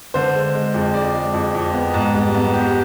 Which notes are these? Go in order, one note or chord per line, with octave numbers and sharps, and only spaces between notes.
D3 C5
G#3
G#3
F2
G#3 D5
G#3
F2
F2
B3
G#2
G3
B3
G3 G4